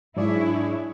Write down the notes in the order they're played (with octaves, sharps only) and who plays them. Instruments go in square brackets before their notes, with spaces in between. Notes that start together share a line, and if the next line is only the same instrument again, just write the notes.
[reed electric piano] G#2 F#3 D5 [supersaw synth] D4 G#4 C#5 [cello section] E4